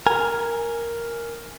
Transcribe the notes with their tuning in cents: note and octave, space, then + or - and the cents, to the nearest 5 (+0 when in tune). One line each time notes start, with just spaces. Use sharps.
A#4 +0 G#5 +0